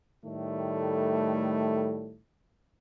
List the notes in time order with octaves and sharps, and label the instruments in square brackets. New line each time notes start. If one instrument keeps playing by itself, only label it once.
[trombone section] A2 D#3 G3 A3